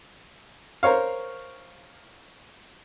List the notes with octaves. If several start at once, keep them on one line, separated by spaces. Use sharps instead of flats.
A#4 C5 C#5 F5